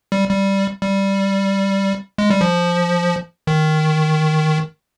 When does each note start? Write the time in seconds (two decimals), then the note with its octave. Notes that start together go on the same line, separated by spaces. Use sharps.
0.12 G3
0.29 G3
0.82 G3
2.18 G#3
2.30 G3
2.41 F3
3.47 D#3